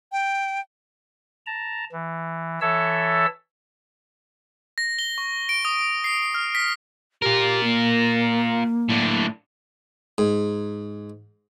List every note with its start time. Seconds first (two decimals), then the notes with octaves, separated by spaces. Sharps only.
0.12 G5
1.46 A5 A#5
1.92 E3
2.61 E3 A4 C#5 E5 A5 E6
4.78 A#6
4.99 G7
5.18 C#6
5.49 D7
5.65 D#6
6.04 C7
6.34 F6
6.55 B6
7.22 F4 G4 A#4
7.63 A#3
8.89 A2 D4
10.18 G#2